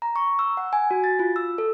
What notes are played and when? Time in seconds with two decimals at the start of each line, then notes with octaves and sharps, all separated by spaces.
0.02 A#5
0.16 C#6
0.39 E6
0.57 F#5
0.73 G#5
0.91 F#4
1.04 A6
1.19 F4
1.36 E6
1.58 A4